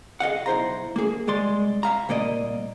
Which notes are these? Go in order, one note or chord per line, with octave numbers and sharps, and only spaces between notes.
G#4 D#5 F5 F#5
B1 E4 C5 A#5
A#3 G#4
C2 G#3 D5 C6
E5 F5 A#5
C2 A#2 A#3 D5 D#5